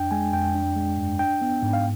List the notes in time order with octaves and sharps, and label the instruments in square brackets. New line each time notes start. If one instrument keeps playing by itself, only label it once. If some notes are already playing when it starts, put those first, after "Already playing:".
Already playing: [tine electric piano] F2 D4 G5
G#3 G#5
F2 G5
D4
G#3
G2
D4 G5
B3
G#2
F5